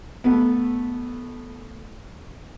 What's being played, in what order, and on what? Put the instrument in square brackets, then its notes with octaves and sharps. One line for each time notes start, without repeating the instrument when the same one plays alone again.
[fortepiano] A3 B3